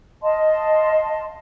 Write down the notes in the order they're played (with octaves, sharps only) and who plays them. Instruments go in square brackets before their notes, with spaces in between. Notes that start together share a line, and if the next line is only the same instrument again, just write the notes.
[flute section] D#5 F5 A5 C6